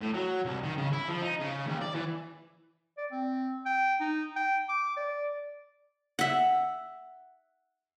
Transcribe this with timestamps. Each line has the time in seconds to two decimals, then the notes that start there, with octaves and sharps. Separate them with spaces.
0.01 A2
0.14 F#3
0.45 C2
0.63 D#3
0.78 C#3
0.93 E4
1.08 F3
1.22 D#4
1.40 C#3
1.66 D#2
1.81 D5
1.94 E3
2.98 D5
3.11 C4
3.66 G5
4.00 D#4
4.36 G5
4.69 D6
4.97 D5
6.19 E5 F#5